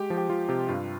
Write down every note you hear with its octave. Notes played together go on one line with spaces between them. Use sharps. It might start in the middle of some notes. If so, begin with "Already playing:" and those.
Already playing: G#3 G4
F3
G4
F3 F4
C3 G4
G2 F4